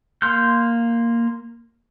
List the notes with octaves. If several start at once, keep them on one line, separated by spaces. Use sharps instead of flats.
A#3 C6 F6 G6